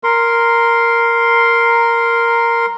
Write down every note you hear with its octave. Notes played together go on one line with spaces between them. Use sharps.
A#4 C6